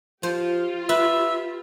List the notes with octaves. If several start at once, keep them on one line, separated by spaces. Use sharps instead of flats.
F3 F4 G4 C5
B4 E5